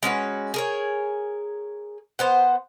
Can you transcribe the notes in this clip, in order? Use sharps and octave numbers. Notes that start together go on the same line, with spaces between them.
G#3 C#4 F#4 B4
G#4 A#4 C#5
B3 C5 F#5